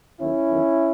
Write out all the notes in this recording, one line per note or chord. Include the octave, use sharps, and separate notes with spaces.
D#2 D#3 F#3 C#4 E4
E2 D#3 F#3